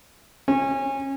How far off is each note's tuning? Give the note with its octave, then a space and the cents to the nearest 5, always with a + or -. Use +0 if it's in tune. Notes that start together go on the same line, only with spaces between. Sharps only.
C#4 -25